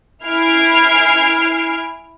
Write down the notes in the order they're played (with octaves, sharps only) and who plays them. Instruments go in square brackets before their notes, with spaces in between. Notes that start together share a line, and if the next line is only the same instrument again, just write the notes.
[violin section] E4 G#5 F6 G#6 C7 D7